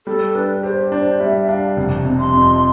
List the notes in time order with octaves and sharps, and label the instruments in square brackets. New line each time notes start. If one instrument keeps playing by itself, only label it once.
[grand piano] G3 [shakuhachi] A4
[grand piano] D4 [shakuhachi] B4
[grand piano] G4 [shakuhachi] C5
[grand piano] D4 [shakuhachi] C5
[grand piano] G3 [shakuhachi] E5
[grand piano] D4 [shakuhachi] F5
[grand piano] F1
C3
[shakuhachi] C6
[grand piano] F2